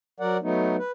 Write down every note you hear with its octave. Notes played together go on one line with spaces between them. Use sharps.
F#3 A#4 D5 F#5
F#3 A3 B3 D#4
B4